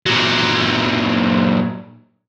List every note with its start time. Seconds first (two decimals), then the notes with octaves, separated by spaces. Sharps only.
0.06 A#2 F#3